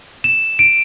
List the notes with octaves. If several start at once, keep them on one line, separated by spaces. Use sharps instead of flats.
E7
D7